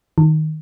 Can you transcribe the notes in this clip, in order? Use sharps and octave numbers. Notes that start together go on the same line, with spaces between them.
D#3